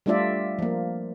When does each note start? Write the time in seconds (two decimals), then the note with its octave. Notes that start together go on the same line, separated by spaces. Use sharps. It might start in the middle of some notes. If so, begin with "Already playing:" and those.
0.06 G3 A3 D4 F4 D5 E5
0.59 F3 A#3